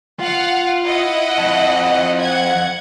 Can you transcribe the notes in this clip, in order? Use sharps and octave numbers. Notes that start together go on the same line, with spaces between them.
F4 F5 F#5
E4 D#5 F#5
F2 A5
F#5 G#6